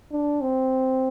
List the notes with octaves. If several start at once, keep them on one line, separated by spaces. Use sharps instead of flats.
D4
C4